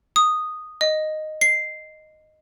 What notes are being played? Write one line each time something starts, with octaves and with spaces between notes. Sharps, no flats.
D#6
D#5
C7